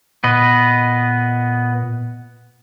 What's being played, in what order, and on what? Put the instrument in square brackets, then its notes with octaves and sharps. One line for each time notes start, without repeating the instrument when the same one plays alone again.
[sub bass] A#2 [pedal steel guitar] B3 B4 D#5